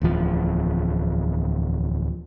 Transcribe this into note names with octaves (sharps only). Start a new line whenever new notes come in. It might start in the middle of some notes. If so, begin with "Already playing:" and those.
D1 E2 F3